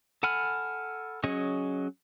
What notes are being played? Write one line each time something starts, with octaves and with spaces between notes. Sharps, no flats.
A4 F#5 G#5 B5 F6
F#3 C#4 G#4 C#5 D#5